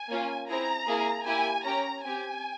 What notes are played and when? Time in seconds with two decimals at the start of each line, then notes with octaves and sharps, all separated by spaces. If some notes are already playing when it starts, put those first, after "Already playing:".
Already playing: G#5
0.09 A#3 C#4 F4
0.48 C4 E4 G#4 A#5
0.87 A#3 E4 G#4
1.26 A#3 E4 G4 G#5
1.64 C#4 G4 A#5
2.03 C4 G4 G#5